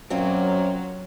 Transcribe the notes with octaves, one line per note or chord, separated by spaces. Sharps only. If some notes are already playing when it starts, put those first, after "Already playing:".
F#2 A#2 F#3 A#3 C4